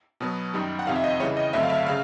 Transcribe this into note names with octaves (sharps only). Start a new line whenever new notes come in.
B2 F#3 B3
F#2 D#3 G3
F#5
F2 C3 D#3 F5
E5
D#5
C#3 E3 G3 C#5
D#5
G2 D3 F#3 A3 C4 E5
F5
E5
C#3 F5